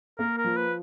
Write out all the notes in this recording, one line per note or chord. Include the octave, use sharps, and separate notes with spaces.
A#3 A#4
A#4
F3
B4